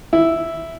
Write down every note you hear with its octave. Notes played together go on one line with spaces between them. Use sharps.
E4